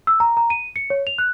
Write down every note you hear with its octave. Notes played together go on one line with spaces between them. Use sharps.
E6
A#5
A#5
D#7
C#7
C#5
F7
F#6